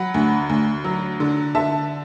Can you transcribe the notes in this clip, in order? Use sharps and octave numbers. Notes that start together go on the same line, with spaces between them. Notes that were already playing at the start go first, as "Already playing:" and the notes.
Already playing: F#3 F#5 B5
D2
D2
F#3
D3
D3 E5 A5